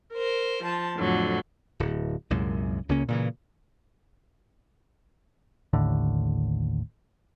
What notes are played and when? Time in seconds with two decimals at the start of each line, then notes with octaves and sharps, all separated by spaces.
0.13 A#4 C5
0.63 F3 A5
0.96 F2 A2 D3 F#3
1.80 D1
2.30 C2 F#2 A#2 G#3
2.89 C#2 C#3 A#3 C#4
3.08 A#2 C#3 E3
5.73 A1 D#2 A2 D3